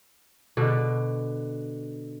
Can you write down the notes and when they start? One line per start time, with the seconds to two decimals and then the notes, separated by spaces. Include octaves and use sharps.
0.57 B2 D3